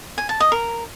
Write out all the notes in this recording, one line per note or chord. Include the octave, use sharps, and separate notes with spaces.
G#5
A5
D#5
A#4